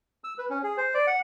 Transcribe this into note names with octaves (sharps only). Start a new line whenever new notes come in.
E6
B4
C#4
G#4
C5
D5
F#5